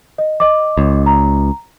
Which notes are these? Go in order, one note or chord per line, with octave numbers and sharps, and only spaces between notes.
D#5
D#5 D6
C#2
A#5